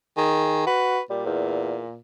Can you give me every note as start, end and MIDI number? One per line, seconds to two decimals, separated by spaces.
0.17 0.63 51
0.17 0.64 68
0.67 0.99 66
0.67 1.01 71
1.10 1.98 46
1.10 1.23 55
1.26 1.83 40